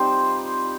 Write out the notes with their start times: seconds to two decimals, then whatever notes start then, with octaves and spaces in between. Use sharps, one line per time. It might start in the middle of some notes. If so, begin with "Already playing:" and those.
Already playing: G3 C4 D#4 F4 C5